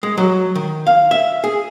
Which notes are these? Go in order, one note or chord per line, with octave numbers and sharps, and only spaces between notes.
G#3
F#3
D#3
F5
E5
G#4